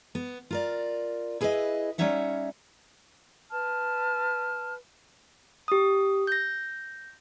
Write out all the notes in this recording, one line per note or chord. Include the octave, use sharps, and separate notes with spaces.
B3
F4 A#4 D5
E4 G#4 B4 C5 D#5 E5
G3 C#4 D#4 C#5 E5 F#5
B4 A5 F6
G4 D#6
G6 A#6